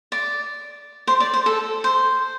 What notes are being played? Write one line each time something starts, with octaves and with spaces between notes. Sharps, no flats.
D5
C5
D5
C5
A4
C5